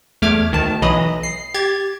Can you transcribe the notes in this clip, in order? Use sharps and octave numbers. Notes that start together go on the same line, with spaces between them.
E2 A3 D6 F6 G#6
D2 D#3 A5
B1 E3 F#3 D#5 B5 D#6
C7
G4 G#6 A6